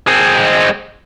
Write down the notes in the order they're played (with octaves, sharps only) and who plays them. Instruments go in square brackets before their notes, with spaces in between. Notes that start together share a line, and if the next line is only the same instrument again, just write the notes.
[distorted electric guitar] G#3 C4